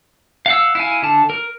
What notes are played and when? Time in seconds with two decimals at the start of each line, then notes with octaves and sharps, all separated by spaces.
0.46 F5 F#5 E6
0.75 E4 F5 G#5
1.02 D3 A5
1.30 A#4